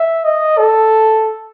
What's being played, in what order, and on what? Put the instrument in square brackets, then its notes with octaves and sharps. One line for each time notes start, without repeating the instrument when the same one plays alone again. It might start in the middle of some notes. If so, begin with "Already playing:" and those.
Already playing: [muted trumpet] E5
D#5
A4